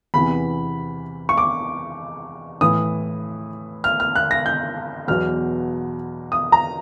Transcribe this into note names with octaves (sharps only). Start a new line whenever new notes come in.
E2 C3 E3 B5
C#6
D6
A2 E3 D#6
F6
F6
F#6
A#6
G6
E2 B2 F#3 F6
D#6
A#5